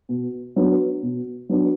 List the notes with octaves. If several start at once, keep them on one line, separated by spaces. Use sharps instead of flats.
B2
F#3 B3 D4
B2
F#3 B3 D4